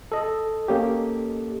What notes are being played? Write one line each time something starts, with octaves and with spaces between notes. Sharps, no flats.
A4 D#5
A#3 C#4 G4